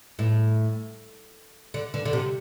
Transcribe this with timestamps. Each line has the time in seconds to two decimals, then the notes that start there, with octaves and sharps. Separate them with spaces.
0.19 A2
1.74 D3
1.94 D3
2.05 D3
2.13 C3